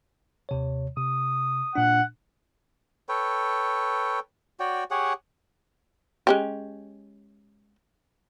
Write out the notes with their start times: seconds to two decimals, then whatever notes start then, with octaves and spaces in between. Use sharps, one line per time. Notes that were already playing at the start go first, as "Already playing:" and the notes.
0.49 D#2 C3 C#5
0.97 C3 D#6
1.75 A#2 D4 F#5
3.09 A4 B4 C#5 G5
4.60 F#4 C#5 D5 G5
4.91 G4 G#4 C#5 F#5
6.27 G#3 C#4 G4